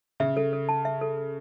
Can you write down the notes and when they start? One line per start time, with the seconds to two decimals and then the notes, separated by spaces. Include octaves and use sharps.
0.20 C#3 E5
0.37 A4
0.53 A4
0.69 A5
0.85 E5
1.01 A4
1.18 A4